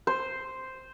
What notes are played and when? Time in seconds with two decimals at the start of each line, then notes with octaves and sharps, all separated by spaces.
0.07 C5